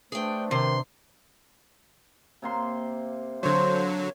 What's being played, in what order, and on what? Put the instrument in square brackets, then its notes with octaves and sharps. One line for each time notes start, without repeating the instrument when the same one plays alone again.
[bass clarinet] A3 [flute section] D4 B4 C5 [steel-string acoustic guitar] G#4 G5
[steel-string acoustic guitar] C3 [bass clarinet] D#3 [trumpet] C6
[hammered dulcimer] C3 A#3 C6
[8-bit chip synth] D3 F#3 [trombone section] C5 [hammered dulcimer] C#5